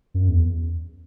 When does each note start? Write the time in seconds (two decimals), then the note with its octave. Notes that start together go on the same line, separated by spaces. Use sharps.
0.14 F#2
0.29 E2